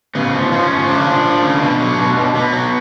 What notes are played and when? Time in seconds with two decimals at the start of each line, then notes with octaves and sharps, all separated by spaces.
0.15 C#3 B3
0.33 F3
0.52 F3 C#4
0.70 F3
0.88 C#3 D4
1.06 F3
1.25 F3
1.43 C#3
1.62 B2
1.80 F#3
1.98 B2
2.16 B2
2.34 B2 B3
2.53 F#3